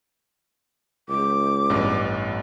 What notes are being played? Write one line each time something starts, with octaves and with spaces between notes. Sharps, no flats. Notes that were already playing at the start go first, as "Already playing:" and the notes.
C#2 D6
A1 G2 B3